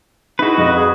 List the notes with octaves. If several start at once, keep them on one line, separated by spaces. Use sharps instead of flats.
D#4 E4 F#4 G#4 B4
F2 D#5
G#4